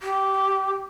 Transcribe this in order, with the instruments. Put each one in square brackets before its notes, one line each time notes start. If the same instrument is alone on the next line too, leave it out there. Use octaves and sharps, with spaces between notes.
[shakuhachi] G4